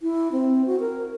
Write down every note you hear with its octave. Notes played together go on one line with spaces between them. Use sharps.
E4
C4
F#4
A#4